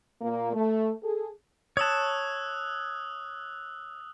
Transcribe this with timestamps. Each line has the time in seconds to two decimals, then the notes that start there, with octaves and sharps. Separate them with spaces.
0.22 A#2 A#3
0.54 A3
1.03 G#4 A4
1.77 C#5 A5 D#6 E6 F#6